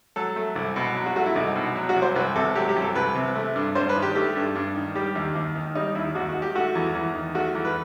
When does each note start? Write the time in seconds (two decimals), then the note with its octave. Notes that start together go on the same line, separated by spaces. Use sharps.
0.16 F#3 A4
0.36 A3
0.56 C2
0.76 B2
0.96 F#3
1.06 F#4
1.16 A3 F#4
1.26 E4
1.36 C2 D#4
1.56 B2
1.76 F#3
1.89 F#4
1.96 C2
2.02 C5
2.16 C2 B4
2.36 C3 A4
2.55 F#3 G4
2.69 G4
2.76 C2
2.82 A4
2.95 C2 B4
3.15 C3
3.36 A3
3.56 G2
3.75 G2 C5
3.89 B4
3.96 D#3
4.02 G4
4.15 A3 G4
4.36 G2
4.55 G2
4.76 D#3
4.95 G3 G4
5.15 D#2
5.35 D#2
5.55 D#3
5.75 G3 D#4
5.95 D#2 E4
6.15 D#2 F#4
6.29 F#4
6.35 D#3
6.42 G4
6.55 A3 F#4
6.75 E2
6.95 E2
7.15 D#3
7.35 A3 F#4
7.55 E2
7.65 B4